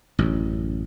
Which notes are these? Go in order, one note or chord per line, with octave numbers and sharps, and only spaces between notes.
A1 F#2